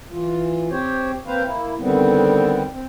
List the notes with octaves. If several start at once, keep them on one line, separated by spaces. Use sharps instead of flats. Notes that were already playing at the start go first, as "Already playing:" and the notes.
E3 F4
C4 G4 C5 C#5
A#3 C4 B4 C5 F5
A#3 E4
D3 D#3 G3 B3 C4
C4